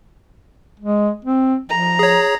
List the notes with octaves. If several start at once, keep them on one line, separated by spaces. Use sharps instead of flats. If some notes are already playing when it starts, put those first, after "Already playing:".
G#3
C4
F3 A#5
G#4 C#5